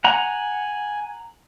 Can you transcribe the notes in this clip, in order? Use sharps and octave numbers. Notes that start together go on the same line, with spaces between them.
F#5 G#5 A#5